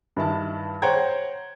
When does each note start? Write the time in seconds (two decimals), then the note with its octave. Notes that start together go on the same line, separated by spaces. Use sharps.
0.16 G2 D#3 E4 A5
0.82 C5 C#5 F#5 G5 A#5 G#6